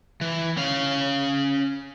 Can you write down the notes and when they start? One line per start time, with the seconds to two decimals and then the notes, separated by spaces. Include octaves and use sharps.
0.21 E3
0.57 C#4 F5